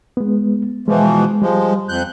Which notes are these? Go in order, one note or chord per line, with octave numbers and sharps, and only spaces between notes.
G#3 B3
B2 E3 F3 G#3
F3 G3 G#3
F2 F#6 G6